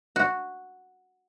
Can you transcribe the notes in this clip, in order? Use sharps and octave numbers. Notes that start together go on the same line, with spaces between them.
F#4